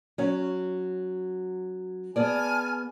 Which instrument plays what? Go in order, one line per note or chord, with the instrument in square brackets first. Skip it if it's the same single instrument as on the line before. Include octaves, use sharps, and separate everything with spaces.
[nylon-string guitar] F#3 C#4
[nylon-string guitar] B3 G#4 D5 [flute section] G#5 A5 F6